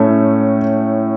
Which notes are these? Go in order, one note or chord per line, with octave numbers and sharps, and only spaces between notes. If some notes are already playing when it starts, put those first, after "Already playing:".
Already playing: A2 A3 C#4